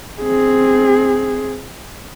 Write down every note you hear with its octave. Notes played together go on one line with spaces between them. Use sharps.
C4 G#4